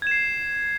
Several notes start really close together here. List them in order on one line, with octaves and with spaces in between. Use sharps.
G#6 E7 C7